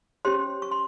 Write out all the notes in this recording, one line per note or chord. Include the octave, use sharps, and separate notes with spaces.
C#4 G4 C5 C#5 C6
C#6
C6